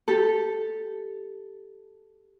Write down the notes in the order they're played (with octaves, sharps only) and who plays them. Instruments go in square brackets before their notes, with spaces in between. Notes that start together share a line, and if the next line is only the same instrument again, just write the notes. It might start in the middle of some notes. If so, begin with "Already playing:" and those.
[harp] G4 A4